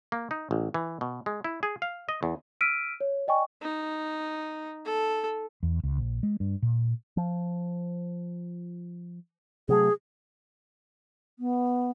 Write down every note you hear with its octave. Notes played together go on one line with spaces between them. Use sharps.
A#3
D#4
A1
E3
B2
G#3
E4
G#4
F5
D#5
E2
E6 F6 B6 D7 D#7
C#5
D5 D#5 G5 G#5 C#6
D#4
A4
E2
C#2
A#1
G#3
G2
A#2
F3
C3 F#3 A3 G#4
B3